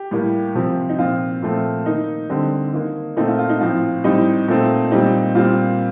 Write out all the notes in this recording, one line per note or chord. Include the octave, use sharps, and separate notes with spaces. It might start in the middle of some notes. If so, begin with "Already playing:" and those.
Already playing: G4
A2 G3 A#3
C3 F3 C4
D#4
A#2 F3 C4 F4
A#2 F3 A3 C4
D#3 A#3 D#4
D3 G3 C4 D#4
D#3 A#3
A#2 A3 C4 D#4
F4
F4
D#4
A2 F3 C4 F4
A2 G3 C4 D#4
A#2 A3 C4
A#2 G3 C4 D#4
A#2 G3 C4 F4